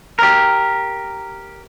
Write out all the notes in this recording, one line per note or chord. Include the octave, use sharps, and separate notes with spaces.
G4 A#4